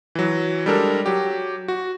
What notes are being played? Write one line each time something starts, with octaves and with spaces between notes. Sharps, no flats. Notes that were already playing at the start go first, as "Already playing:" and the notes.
E3 F#3
G3 G#3 D4 A4 A#4
F#3 G4
F#4